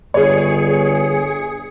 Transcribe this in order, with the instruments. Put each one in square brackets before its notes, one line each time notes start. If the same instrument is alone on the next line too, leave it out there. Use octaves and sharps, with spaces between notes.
[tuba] G1 [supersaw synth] G#4 C#7 [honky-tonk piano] C#5